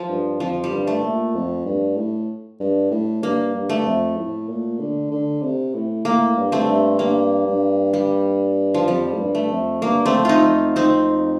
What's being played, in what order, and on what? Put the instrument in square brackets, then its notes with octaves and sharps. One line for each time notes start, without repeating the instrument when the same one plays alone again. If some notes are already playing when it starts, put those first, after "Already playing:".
Already playing: [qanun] F3
[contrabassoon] G2
[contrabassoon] F2 [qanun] F3
[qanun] G3
[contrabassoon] G2
[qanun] A3
[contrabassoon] A#2
F2
G2
A2
G2
A2
[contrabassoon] G2 [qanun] A#3
[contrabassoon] G2
[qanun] A3
[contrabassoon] F2
A2
A#2
D3
D3
C3
A2
[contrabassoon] A2 [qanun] A#3
[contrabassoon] G2
[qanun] A3 C4
[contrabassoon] G2
[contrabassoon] G2 [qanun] A#3
[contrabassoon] G2
[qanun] G3
F3
[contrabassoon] F2 [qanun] G3
[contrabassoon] A2
G2
[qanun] A3
[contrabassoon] F2
[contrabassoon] G2 [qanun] A#3
[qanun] A3 C4
[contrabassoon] F2
[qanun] C4 D#4 F4
[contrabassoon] F2
[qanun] C4 D#4